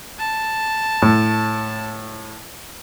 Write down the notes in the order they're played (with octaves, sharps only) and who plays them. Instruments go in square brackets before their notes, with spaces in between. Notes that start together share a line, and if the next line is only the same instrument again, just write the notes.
[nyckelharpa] A5
[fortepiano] A2